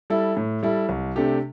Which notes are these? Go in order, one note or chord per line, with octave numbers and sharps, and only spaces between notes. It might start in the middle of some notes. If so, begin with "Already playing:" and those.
G3 E4 A4
A2
G3 E4 A4
C2
C3 A3 D4 G4